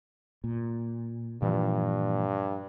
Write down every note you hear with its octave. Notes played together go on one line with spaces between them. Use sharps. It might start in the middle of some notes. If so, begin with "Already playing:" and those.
A#2
G2 A#2 E3 F3